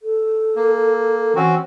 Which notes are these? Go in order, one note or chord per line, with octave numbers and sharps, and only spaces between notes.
A4
A#3
E3 C4 C#4 F#4